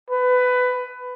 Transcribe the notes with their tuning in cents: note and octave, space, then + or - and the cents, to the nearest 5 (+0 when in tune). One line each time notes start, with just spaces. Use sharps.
B4 +20